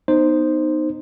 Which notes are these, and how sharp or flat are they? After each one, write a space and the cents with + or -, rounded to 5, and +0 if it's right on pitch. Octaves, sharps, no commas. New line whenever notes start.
B3 +0 D#4 -15 C5 +0